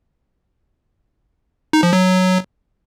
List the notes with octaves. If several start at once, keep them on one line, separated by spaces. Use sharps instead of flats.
D#4
F3
F#3